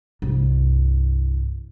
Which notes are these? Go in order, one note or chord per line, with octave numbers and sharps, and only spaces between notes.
C2 G2